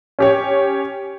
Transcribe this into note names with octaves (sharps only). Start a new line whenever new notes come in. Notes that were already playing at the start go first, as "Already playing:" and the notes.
C#4 G4 C#5